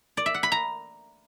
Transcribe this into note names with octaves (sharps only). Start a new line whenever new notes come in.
D5
E5
F#5
B5
A#5